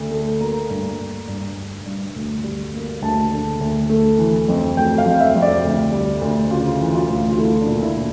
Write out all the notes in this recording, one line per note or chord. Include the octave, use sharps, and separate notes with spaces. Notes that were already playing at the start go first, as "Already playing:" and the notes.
Already playing: D2 D3 A3
A3
A#3 A#5
G2
G2
G2
G2
G2
D2
G3
A#3
D2 A5
D3
D2
A3
E3
F2
A3 G5
F5
F2
E5
F2
D5
D2
G3
D2
C#3 F4
E3
F4
D2
F4
A3 E4
D4
A#2
E4
A#2